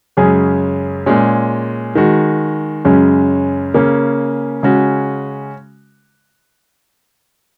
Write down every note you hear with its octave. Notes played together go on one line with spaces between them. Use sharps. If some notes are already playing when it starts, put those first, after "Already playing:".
F#2 C#3 G#3 C#4 G#4
A#2 G#3 C#4 G#4
D#3 G#3 F#4
F#2 C#3 G#3 C#4
C#3 A#3 C#4
C#3 G#3 C#4 F#4